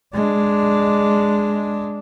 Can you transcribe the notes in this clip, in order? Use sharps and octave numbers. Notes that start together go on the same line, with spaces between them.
G#3 D4